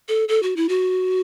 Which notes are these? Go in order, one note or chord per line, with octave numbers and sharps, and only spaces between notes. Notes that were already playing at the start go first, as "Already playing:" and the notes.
A4
A4
F#4
E4
F#4